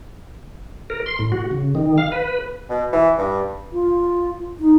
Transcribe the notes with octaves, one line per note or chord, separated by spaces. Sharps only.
A#4
C6
A2
F#4
C#3
D#3
F5
B4
B2
E3
G2
F4
D#4